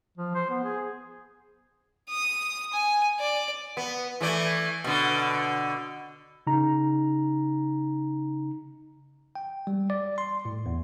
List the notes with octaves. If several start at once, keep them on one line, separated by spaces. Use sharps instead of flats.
F3
C5
B3
G#4
D#6
G#5
D5
B3
E3 A3 D5
B2 D3
C#3 D#4 A#5
G5
G3
D5
C6
A2
E2